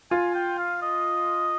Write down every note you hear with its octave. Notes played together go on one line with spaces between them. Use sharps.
F4 G#5
G5
F5
D#5